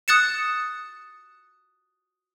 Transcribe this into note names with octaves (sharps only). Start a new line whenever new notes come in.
D#6 F#6 A6 C#7 E7